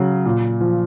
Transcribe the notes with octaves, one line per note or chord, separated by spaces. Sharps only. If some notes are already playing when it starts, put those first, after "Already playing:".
Already playing: C#3 F#3
A#2
F3